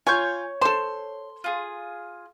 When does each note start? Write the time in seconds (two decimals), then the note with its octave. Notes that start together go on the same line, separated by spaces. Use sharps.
0.07 F4 C#5 G#5 C#6 G6
0.61 A4 C5 C6
1.44 F4 G#4